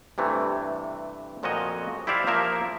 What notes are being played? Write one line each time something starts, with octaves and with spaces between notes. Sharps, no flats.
G2 C3 E3 A3
F2 A#2 F3 F#4 C#5 D#5
E4 G4 C5 D5 E5 F5
F3 A#3 A#4 E5